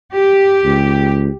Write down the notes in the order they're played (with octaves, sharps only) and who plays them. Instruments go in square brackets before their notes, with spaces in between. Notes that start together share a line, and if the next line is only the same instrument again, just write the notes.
[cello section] G4
[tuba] C#2